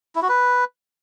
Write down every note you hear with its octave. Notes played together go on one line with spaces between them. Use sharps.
E4
F#4
B4